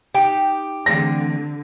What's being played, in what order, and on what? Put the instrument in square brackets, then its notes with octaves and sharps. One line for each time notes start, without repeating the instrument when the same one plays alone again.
[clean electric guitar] D#4 G5 [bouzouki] G4
[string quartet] D3 [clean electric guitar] E3 A3 C4 [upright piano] A#6